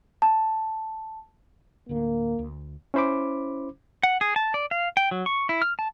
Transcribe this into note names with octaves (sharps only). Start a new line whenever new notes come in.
A5
D1 D2 D3 A#3
D2
C#4 E4 C5 B5 D6
F#5
G#4
A5
D5
F5
G5
F#3
C#6
E4
F6
A5